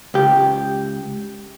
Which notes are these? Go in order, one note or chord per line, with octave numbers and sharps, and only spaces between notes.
C#2 G4